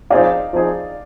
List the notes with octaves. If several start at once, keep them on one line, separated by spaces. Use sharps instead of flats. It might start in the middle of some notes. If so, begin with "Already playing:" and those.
F3 C4 D#4 G#4 D5 D#5 F5
F3 C4 D#4 G#4 D#5